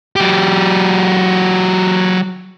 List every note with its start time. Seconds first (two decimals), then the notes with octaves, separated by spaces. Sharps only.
0.16 F#3 G4